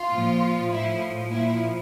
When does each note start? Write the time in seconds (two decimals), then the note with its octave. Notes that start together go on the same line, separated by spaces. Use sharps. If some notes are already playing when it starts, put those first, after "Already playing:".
Already playing: F4
0.12 A#2 F3
0.71 A2 F3 E4
1.31 A#2 E4
1.36 F3